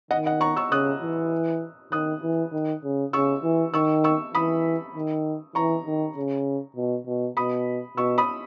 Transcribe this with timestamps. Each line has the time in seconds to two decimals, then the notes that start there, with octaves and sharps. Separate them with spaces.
0.11 D#3 D#5 F#5
0.26 D#5 F#5
0.41 A#5 C#6
0.56 C#6 E6
0.72 C#3 D#6 F#6
1.02 E3
1.92 D#3 D#6 F#6
2.23 E3
2.53 D#3
2.84 C#3
3.13 C#3 C#6 E6
3.43 E3
3.74 D#3 C#6 E6
4.04 C#6 E6
4.34 E3 B5 D#6
4.95 D#3
5.55 E3 A#5 C#6
5.86 D#3
6.16 C#3
6.77 B2
7.07 B2
7.37 B2 B5 D#6
7.97 B2 C#6 E6
8.18 B5 D#6